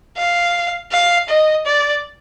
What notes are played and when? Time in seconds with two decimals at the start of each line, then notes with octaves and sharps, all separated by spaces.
0.17 F5
0.92 F5
1.28 D#5
1.66 D5